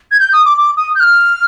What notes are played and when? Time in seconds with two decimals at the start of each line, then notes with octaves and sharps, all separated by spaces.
0.11 G#6
0.20 G6
0.33 D#6
0.45 D6
0.58 D6
0.77 D#6
0.95 G6
1.00 F6